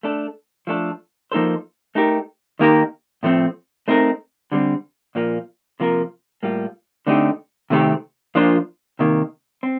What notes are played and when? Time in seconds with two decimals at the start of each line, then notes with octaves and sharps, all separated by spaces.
0.03 A3 D4 A4
0.67 F3 A3 D4 A4
1.32 F3 A#3 D#4 A4 C5
1.95 A3 D#4 G4 A#4
2.59 D#3 A#3 D#4 G4 A#4
3.23 A2 F3 A3 C4
3.88 A3 C4 D#4 A#4
4.52 D3 G3 C4
5.15 A#2 F3 A#3 F4
5.80 C3 F3 A#3 F4 A#4
6.43 A2 G3 A#3 F4
7.07 D3 A3 C4 D#4 G4
7.70 C3 D#3 A3 C4 G4
8.35 F3 A#3 D4 F4 C5
8.99 C3 D#3 A#3
9.63 C4